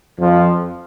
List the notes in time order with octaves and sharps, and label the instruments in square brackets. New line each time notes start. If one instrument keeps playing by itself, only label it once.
[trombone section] F2 F3